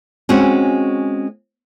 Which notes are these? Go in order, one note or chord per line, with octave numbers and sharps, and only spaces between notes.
G#3 C4 C#4 F#4